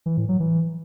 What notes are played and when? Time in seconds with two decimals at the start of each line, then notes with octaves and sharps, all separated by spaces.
0.06 E3
0.17 A2
0.29 F#3
0.40 E3